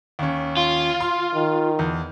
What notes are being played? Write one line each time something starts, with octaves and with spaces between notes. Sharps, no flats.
D#2 C#4
F4
C6
D#3
E2